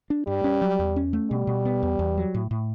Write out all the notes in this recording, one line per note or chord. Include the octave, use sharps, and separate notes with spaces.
D4
G2 G3
C#4
F#3
E2
C#4
A3
B2 G3
B2
B3
E2
E2
F#3
A2
A2